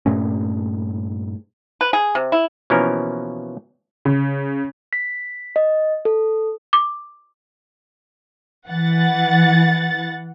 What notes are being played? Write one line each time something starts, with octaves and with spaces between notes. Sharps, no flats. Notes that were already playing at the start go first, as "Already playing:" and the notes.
G2 A#2 A3 C#4
B4
G#4
C3
E4
B2 E3 F3 A#3 C#4 A#4
C#3
B6
D#5
A4
D6
E3 F#5 A6